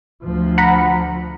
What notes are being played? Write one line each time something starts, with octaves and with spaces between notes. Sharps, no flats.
D2 F3
F#5 A#5 B5